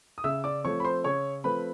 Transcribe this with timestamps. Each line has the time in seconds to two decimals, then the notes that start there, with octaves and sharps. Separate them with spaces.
0.18 D#6
0.24 C#3 E5 E6
0.44 D5 D6
0.64 F3 A3 C4 C#5 C#6
0.80 B5
0.84 C5 C6
1.04 C#3 C#5 C#6
1.44 F3 A3 C4 B4 B5